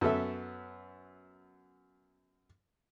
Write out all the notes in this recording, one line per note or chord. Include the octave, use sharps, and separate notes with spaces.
F#2 B3 A4 E5